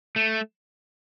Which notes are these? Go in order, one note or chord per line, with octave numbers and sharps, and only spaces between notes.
A3